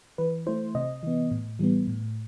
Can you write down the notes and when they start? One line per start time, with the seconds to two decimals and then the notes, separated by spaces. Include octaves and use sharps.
0.18 E3 B4
0.46 A3 E4 C5
0.75 C3 D#5
1.03 E3 B3
1.31 A2
1.59 E3 G3 B3
1.87 A2